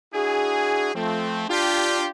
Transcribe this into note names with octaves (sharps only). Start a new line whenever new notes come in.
D4 E4 F#4 G#4
F3 A3 C4
D4 F4 G4